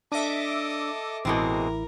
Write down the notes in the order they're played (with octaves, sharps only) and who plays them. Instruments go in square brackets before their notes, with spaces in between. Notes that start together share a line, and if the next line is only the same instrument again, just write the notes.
[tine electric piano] D4 [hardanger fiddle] A4 D#5 [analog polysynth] E5 D6
[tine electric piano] A1 E4 [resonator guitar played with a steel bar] B2 G#3 C4 [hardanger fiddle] A#4